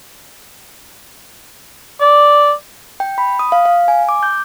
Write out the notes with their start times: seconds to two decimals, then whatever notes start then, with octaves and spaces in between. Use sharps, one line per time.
2.01 D5
3.00 G5
3.18 B5
3.39 D#6
3.52 F5
3.65 F5
3.88 G#5
4.09 D6
4.23 G6